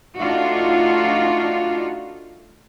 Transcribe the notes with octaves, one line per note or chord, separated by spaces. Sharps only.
A3 D4 D#4 F4 F#4